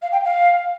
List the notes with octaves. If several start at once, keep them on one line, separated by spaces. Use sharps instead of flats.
F5
G5
F5